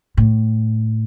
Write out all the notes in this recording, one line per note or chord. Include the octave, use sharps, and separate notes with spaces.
A2